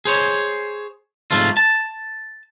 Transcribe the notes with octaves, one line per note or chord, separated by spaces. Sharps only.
G#4 C5 C#5
G#2 C3 F3 A3 F4
A5